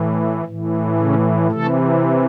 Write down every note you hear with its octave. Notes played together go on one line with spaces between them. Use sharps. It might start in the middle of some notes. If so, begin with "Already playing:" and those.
Already playing: A2 E3
A2 E3
C#3 C#4
C3 E3 A3 A4